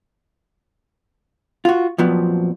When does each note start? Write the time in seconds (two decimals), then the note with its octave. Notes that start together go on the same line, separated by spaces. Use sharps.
1.65 F4 F#4
1.98 F2 A#2 F3 F#3 B3